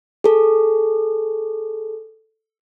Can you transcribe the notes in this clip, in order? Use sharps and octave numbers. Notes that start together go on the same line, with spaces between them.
G#4 A4